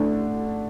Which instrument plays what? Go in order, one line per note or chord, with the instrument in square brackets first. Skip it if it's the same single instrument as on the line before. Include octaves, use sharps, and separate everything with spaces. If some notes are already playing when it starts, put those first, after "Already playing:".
Already playing: [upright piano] D3 A3 D4